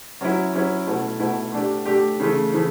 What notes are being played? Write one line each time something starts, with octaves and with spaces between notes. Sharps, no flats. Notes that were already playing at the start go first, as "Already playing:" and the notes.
F#3 C#4 E4
F#3 C#4 E4
B2 A3 E4
B2 A3 E4
A3 D4 G4
A3 D4 G4
C#3 E3 A3
C#3 E3 A3